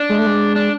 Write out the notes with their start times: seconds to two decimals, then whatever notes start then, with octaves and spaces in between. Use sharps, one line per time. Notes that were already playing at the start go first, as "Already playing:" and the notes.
Already playing: D4
0.09 G#3
0.19 A3
0.27 G#3
0.56 D4